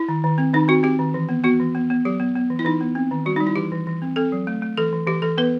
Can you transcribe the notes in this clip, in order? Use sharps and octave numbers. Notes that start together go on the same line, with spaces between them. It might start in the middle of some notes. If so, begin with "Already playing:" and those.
Already playing: E4
D#3
D#3
C4
D#3 D#4
C4 F#4
C4 G4
D#3
E3
B3
B3 F#4
E3
B3
B3
F#3 G4
B3
B3
E3
E4
E3 D#4
B3
C4
D#3
G3 F#4
G3 D#4
E4
E3 G4
E3
E3
C4
C4 A4
F#3
A3
A3
E3 A4
E3
E3 G4
E3 A4
B3 B4